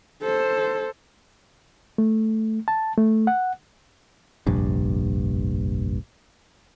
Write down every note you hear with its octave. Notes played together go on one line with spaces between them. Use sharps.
A4 C5
A3
A5
A3
F#5
F1 A#1 G2